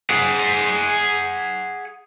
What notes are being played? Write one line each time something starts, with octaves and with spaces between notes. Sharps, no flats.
G#4 F#5